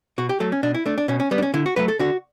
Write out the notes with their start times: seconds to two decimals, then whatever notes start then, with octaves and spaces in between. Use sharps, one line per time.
0.18 B2 F#4
0.29 G4
0.40 F#3 A3 A4
0.52 C#4
0.63 B2 D4
0.74 E4
0.86 A3 D4
0.98 D4
1.08 B2 C#4
1.20 C#4
1.31 G3 B3
1.38 D4
1.42 C#4
1.54 D3 E4
1.66 F#4
1.76 F#3 A3 B4
1.88 A4
1.99 D3 F#4